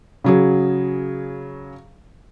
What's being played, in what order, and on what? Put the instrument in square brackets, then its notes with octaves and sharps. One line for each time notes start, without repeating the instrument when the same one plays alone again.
[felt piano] C#3 F#3 G#4